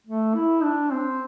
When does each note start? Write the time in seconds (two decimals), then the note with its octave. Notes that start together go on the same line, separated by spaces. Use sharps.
0.07 A3
0.35 E4
0.63 D4
0.92 C4